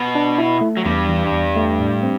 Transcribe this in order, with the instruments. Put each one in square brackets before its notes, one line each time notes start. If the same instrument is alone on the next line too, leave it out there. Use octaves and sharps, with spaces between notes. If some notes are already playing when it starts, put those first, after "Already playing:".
Already playing: [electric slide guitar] B2 B3
[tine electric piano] D4
E4
A3
[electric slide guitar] F#3
[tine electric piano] E2 [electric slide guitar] G2 G3
[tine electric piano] E3
E2
A3
A2
C4